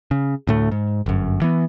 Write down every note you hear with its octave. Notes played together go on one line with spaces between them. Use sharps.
C#3
D2 A2 A3
G#2
G1 F#2
E3 B3